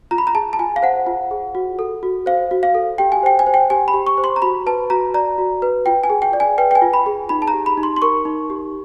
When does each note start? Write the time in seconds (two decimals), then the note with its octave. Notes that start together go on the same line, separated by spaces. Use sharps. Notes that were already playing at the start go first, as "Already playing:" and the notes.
0.11 F4 A#5
0.18 B5
0.27 A#5
0.35 G#4 A5
0.53 A5
0.59 F4 G#5
0.76 F5
0.82 C5 F#5
1.07 F4
1.31 G#4
1.55 F#4
1.79 A4
2.03 F#4
2.26 C5 F5
2.51 F#4
2.63 F5
2.75 A4
2.98 G4 G5
3.12 G#5
3.23 C5 G5
3.39 G#5
3.47 C5
3.54 G5
3.70 G4 G#5
3.88 B5
3.94 G4
4.07 C#6
4.18 C5
4.24 C6
4.36 A#5
4.42 F#4 B5
4.66 B4 A5
4.90 F#4 A#5
5.14 D5 A#5
5.38 F#4
5.62 B4
5.86 F4 G5
6.04 G#5
6.10 G#4
6.22 G5
6.33 D5
6.40 G#5
6.58 B4 G5
6.71 G5
6.75 G#5
6.82 F4
6.94 B5
7.06 G#4
7.29 D#4 B5
7.42 A5
7.48 A#5
7.54 G4
7.66 B5
7.77 D#4
7.83 C6
7.96 C6
8.02 A#4 C#6
8.25 D#4
8.50 G4